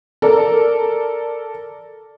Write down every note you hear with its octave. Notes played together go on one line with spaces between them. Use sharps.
A4 A#4 D5